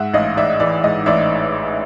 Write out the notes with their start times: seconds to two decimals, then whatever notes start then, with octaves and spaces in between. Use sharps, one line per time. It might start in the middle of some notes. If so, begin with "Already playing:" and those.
Already playing: G#2 E5 F#5
0.13 A1 D#5 F5
0.37 A1 D5 E5
0.60 E3 D5 E5
0.83 G#2 D#5
1.06 A1 D5 E5